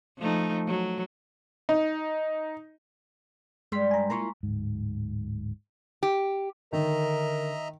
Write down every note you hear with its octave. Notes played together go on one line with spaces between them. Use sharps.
F3 A3 D#4
F#3
D#4
G2 G#3 C6 B6
G#5 A#5
A#3 E4 F4 A#5 C6 C#6
D1 G#2
G4
D3 D#3 A#4 D#5 E5 A#5